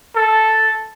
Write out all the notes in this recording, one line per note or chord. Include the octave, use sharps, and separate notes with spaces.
A4